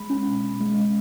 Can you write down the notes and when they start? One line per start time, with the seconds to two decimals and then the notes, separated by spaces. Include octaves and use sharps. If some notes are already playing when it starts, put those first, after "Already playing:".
Already playing: G#3 B5
0.10 C#4
0.27 B2
0.44 B2
0.61 G#3
0.78 C#4